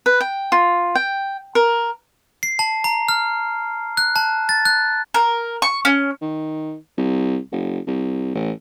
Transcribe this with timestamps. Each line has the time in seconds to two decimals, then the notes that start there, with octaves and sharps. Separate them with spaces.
0.06 B4
0.21 G5
0.52 F4
0.95 G5
1.55 A#4
2.43 C7
2.59 A5
2.84 A#5
3.09 F6
3.97 F#6
4.16 A5
4.49 A6
4.65 F#6
5.14 A#4
5.62 C#6
5.85 C#4
6.21 D#3
6.98 C2
7.52 F#1
7.87 C2
8.35 A1